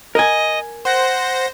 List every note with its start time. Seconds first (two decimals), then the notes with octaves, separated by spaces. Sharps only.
0.15 A#4 D#5 G#5
0.85 C5 F#5 A#6